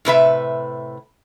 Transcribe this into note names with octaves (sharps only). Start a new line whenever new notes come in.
A2 C3 B4 E5